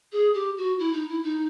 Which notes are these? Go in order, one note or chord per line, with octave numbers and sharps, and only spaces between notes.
G#4
G4
F#4
E4
D#4
E4
D#4